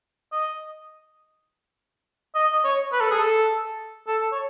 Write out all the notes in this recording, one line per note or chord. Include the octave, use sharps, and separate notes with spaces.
D#5
D#5
D#5
C#5
B4
A4
G#4
A4
A4
C#5